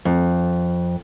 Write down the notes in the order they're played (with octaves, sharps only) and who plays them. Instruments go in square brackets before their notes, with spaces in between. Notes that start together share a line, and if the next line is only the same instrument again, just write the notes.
[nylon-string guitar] F2